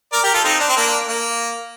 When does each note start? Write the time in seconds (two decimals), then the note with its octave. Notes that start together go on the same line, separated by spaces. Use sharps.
0.13 A#4 D5
0.23 G4 A#4
0.34 F4 A4
0.44 C4 D#4
0.60 D4
0.69 C4
0.77 A#3 D4
1.07 A#3